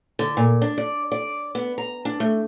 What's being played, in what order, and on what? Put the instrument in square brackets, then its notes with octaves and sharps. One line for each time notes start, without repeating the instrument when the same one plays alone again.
[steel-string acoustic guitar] D3
A#2
D4
D5
D5
B3
A#5
D4
A3